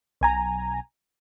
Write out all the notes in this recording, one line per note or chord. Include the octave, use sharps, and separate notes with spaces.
B1 G#5 A#5